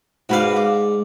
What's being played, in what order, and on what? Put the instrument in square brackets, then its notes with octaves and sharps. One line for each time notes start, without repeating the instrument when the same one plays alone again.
[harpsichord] G#2 D5 [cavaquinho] F#4 B4 F5
[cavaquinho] D6